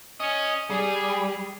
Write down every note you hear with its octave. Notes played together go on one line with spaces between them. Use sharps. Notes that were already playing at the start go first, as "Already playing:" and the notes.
C#4 D#5
G3 G#4